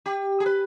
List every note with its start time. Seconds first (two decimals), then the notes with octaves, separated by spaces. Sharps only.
0.06 G4
0.40 G#4
0.46 B4